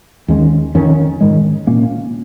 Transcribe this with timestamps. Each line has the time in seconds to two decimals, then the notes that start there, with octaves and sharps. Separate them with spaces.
0.28 D#2 D#3 G#3 C#4
0.75 F2 D#3 C#4
1.21 G#2 D#3 G#3
1.67 A#2 A#3 C#4